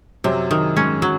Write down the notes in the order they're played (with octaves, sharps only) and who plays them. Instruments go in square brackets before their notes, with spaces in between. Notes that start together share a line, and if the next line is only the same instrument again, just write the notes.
[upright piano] F#2 F#3 [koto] C3
[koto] D#3
[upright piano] G#2 G#3 [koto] C#4
[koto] F#3